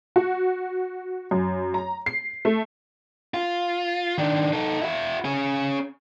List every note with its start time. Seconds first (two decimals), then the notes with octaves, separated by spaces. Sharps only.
0.16 F#4
1.31 F#2
1.74 A#5
2.06 C7
2.45 A3
3.34 F4
4.18 D#3 D4
4.53 D#4 A4
4.82 E4 F#4
5.25 C#4 G#4